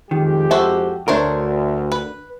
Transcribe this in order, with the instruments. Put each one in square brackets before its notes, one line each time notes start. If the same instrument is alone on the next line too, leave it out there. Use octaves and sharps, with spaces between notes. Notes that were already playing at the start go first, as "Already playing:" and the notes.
[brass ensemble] F2 G#3 G4 [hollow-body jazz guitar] D#3
[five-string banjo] F#4 A4 E5 [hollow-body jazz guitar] C5
[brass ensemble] D2 [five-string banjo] A3 C5 C#5 [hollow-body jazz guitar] D4 A#4
[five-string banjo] B4